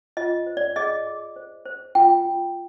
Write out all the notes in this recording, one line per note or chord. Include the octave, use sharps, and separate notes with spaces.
F4 D#5
C5
D5
G#4 D#5
G#4
C5
C5
F4 G5
F4